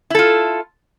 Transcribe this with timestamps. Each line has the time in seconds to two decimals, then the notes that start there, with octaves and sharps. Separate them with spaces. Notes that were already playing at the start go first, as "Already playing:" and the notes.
0.10 E4
0.15 A4
0.19 F4